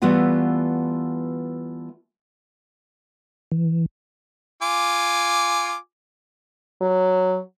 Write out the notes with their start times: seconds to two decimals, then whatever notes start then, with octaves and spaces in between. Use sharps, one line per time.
0.02 E3 G3 A3 B3 F4 F#5
3.52 E3
4.62 F4 G#5 D6
6.81 F#3